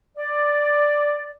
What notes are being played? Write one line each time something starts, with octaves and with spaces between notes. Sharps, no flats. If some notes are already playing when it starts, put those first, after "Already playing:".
D5